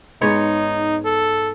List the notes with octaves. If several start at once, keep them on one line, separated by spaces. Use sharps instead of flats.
G#2 B3 D#4 C#5
A4